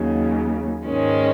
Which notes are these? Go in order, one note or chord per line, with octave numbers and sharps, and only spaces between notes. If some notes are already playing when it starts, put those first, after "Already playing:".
Already playing: D#2 C#3 F#3
G#2 D#3 G#3 C#4